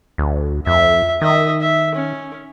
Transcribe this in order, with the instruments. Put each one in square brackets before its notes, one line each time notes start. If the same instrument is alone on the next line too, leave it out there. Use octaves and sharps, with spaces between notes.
[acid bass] D2
[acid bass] F2 [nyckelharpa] E5
[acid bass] D#3 [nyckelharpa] D#5 E5
[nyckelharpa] E5
C#4